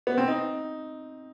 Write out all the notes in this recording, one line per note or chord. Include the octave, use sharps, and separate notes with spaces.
B3
C4
D#4